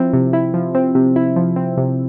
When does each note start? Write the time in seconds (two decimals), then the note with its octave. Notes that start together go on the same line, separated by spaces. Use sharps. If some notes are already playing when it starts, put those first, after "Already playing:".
Already playing: F3 C4 E4
0.13 C3
0.33 E4
0.54 F3
0.75 C4
0.95 C3
1.16 E4
1.36 F3
1.56 C4
1.77 C3